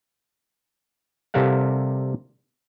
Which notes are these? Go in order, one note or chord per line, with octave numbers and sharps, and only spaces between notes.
C3 G3 A4 A#4 F5 F#5